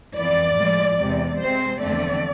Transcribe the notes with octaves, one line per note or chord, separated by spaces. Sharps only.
F2 E3 B3 D5
A2 F3 G#3
E2 C3 G#3
C3 G#3 C4 C5
E2 D3 F3 A3 C4 D5